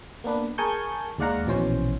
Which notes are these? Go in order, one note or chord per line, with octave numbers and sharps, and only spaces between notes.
A#3 B3 D4 B4
G#4 A#4 G#5 A5 C#6 G6
D#2 G#3 D5 F5 F#5 A#5
A#1 B2 E3 C#4 C5